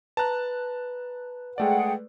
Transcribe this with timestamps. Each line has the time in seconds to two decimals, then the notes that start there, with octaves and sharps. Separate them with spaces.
0.17 B4 A5 A#5 F#6
1.58 G#3 A3 G#4 D5 F#5 G5